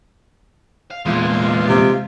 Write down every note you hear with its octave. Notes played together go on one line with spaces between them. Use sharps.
F5
E2 A#2 G#3 F4
C3